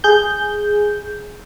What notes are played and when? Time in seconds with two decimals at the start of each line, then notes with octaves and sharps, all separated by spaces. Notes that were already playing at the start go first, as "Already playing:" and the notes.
0.04 G#4 G6